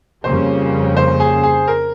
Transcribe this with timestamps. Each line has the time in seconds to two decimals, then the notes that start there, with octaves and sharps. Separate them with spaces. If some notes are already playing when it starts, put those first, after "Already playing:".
0.24 F2 C#3 G3 A#3 C#4 C5
0.97 C5
1.20 G#4
1.43 G#4
1.68 A#4